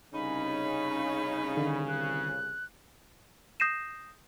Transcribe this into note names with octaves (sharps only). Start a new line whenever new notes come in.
C2 C#3 C#4 D#4 B5
D3 D#3
F#6
D#6 G6 A#6 C7 D#7 E7